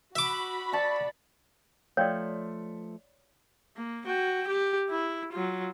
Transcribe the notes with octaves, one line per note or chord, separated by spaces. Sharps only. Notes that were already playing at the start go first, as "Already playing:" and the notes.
F#4 E5 B5 D6
D5 A5 C#6
F3 A3 C#5 D5 F5 G5
A#3
F#4 G5
G4
E4
F#3 F4